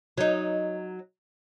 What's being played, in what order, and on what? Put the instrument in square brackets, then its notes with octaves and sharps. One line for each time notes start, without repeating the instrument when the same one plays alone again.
[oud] F#3 D#4